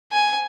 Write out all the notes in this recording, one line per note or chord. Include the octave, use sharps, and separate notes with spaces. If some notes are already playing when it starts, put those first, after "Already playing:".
G#5